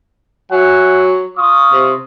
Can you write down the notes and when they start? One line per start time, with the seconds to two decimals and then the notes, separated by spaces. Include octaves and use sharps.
0.52 F#3 E5 F#5 G#5
1.37 F4 C#6 D#6
1.72 C3